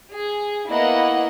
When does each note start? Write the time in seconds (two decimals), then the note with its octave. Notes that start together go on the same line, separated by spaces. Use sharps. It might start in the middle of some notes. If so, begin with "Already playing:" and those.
0.12 G#4
0.70 A#3 B3 E4 D#5 F#5